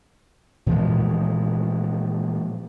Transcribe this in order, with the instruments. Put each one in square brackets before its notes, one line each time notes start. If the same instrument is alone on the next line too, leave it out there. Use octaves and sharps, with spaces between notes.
[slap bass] A#2 E3 F3 G#3